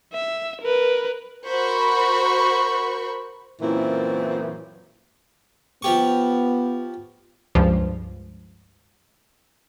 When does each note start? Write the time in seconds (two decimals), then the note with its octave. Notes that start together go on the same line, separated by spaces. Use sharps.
0.13 E5
0.61 A#4 B4
1.46 F#4 A#4 C5 B5 C#6
3.62 F#2 A#2 E3 C4 C#4 E4
5.82 F3 B3 G4 C#6
7.55 C#2 G2 F3